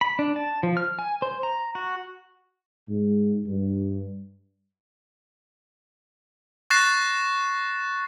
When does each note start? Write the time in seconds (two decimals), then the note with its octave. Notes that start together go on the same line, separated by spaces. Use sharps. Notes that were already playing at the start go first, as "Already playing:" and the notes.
0.01 B5
0.19 D4
0.36 A5
0.63 F3
0.77 F6
0.99 G#5
1.22 C5
1.43 A#5
1.75 F#4
2.88 G#2
3.45 G2
6.70 C#6 F#6 A6 A#6 C7 E7